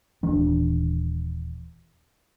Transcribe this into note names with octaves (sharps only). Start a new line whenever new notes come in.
D#1 E3 D4